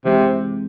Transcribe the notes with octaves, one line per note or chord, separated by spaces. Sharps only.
C3 E3 G#3 C4